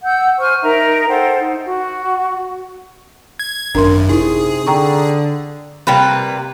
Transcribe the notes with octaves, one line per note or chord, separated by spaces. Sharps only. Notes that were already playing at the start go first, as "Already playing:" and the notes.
F#5 E6 G6
C5 G#5 C#6 F6
D#4 A#4 E5 A#5
A4 C5 F#5 G5
D#4
F#4
G#6
G#1 F#2 D4 A#4 C6
C3 D#4 E4 G#4
D3 G5 A#5 C#6
C3 G3 A#3 B4